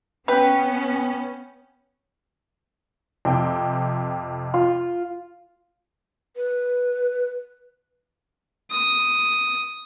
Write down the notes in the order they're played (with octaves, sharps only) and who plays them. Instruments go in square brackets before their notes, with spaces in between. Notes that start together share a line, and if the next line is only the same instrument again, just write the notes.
[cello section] B3 C#4 [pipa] B4 [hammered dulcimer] G5
[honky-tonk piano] F2 C3 G5
[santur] F4
[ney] B4
[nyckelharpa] D#6